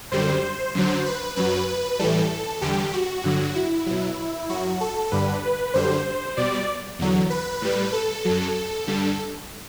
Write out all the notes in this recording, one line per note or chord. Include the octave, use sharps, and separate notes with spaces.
F#2 D3 G3 C5
F#2 D3 F#3
B4
F#2 F#3 B4
B4
A2 E3 G3 A4
E2 D3 G3 G4
F#4
G2 D3 F#3
E4
B2 F#3
F#2 F#3 F#4
A4
G2 D3 G3 B4
B4
F#2 D3 G3 C5
C5
B2 G3 D5
E2 D3 F#3
B4
A2 G3
A4
F#2 F#3
A4
G2 D3 G3